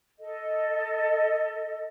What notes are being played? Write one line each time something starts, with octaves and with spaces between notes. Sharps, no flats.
A4 D#5